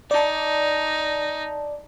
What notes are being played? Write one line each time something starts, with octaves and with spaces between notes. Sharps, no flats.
D#4 D5 A5